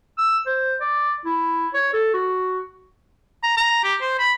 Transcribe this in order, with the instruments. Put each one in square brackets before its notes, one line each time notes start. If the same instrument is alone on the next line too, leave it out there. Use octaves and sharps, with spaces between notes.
[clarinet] E6
C5
D5
E4
C#5
A4
F#4
[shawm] A#5
A#5
G4
C5
B5